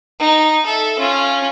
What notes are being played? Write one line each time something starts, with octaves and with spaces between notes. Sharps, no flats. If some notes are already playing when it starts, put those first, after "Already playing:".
D#4
A4 E5
C#4 F4